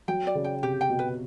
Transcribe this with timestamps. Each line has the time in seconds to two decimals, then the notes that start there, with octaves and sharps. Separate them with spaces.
0.08 F#3 G5
0.27 D5
0.35 C#3
0.44 G5
0.62 C3 G4
0.81 G5
0.90 B2
0.99 B4